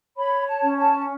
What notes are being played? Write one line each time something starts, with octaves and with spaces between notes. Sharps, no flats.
C#5 B5
A5
C#4
A5